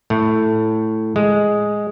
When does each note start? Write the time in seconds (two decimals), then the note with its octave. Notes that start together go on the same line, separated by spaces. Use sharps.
0.10 A2
1.16 G#3